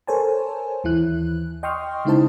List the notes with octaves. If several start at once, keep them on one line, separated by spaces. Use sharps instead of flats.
A4 A#4 C5 C#5 G#5 A5
D#2 E3 E4 F#6
D#5 G5 C6 C#6 D#6 F6
C#3 G#3 D#4 E4 C5 A5